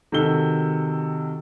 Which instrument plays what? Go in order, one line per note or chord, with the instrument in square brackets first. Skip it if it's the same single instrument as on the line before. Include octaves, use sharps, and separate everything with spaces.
[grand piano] C3 D#3 F#4 A4 G7